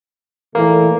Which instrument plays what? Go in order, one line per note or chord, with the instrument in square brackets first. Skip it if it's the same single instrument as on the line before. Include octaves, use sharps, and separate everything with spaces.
[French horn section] A#2 E3 A3 [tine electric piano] A#3